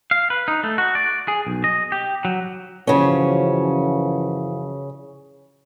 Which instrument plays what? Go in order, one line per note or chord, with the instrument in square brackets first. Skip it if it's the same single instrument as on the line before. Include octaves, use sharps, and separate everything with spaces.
[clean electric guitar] F5
B4
D#4
A3
F#4
D5
G#4
B1
D#5
G4
F#3
[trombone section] F#2 E3 F3 [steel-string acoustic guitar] C#3 C#4